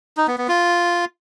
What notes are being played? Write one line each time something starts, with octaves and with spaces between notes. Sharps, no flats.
D#4
B3
B3
F4